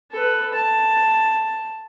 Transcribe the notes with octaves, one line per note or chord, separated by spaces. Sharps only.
A4 B4
A5